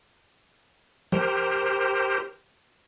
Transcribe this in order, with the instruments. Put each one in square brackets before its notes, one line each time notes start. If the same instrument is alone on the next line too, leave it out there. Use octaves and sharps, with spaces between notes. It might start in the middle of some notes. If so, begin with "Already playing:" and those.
[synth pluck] F3 [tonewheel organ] G4 A#4 C5